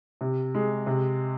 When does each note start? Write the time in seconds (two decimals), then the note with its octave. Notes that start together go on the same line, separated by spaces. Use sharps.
0.21 C3
0.55 G#3
0.87 C3